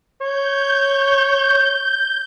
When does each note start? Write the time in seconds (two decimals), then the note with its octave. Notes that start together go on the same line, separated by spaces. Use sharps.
0.21 C#5 G6